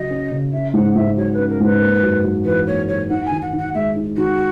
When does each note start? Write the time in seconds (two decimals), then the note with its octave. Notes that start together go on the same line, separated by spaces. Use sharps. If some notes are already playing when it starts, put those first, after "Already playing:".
Already playing: C#3 F#3 F#4 D#5
0.10 C#4
0.31 C#3
0.53 C#4 E5
0.74 G#2 F#5
0.95 G#2 E5
1.17 F#3 C#5
1.34 C#4 B4
1.49 A#4
1.60 G#2 B4
1.81 A#3
2.03 F#2
2.24 F#2
2.45 E3 B4
2.67 A#3 C#5
2.88 F#2 C#5
3.10 D#4 F#5
3.26 G#5
3.31 D#3
3.42 F#5
3.53 D#3
3.58 F#5
3.74 G#3 E5
3.96 D#4
4.17 D#3 F#4